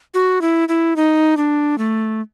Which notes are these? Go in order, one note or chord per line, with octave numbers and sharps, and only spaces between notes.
F#4
E4
E4
D#4
D4
A3